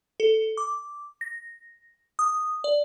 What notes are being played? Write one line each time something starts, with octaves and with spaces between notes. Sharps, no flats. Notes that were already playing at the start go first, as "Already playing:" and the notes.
A4
D6
A#6
D#6
D5